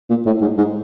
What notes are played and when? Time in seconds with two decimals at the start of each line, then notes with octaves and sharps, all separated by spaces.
0.10 A#2
0.26 A2
0.41 G#2
0.58 G#2